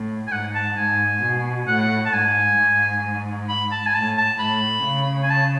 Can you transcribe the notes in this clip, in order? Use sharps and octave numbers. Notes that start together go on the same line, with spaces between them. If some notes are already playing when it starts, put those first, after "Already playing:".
Already playing: A2
G#5
G#2 F#5
A5
G#2 G#5
B2
A2 F#5
A5
G#2 G#5
G#2
B5
A5
G#5
A2 A5
A5
A2 B5
C#3
G#5
A5